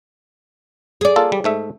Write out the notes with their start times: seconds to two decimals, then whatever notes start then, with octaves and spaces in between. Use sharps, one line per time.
1.01 G#4 D5
1.16 A#3 F4 A4
1.32 G3
1.44 G#2 A3 E5